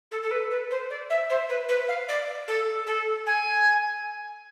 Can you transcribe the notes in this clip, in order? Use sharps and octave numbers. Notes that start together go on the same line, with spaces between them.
A4
A4
B4
B4
C5
D5
E5
C5
B4
B4
F5
D5
A4
A4
G#5